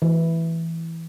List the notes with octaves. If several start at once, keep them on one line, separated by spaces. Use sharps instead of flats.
E3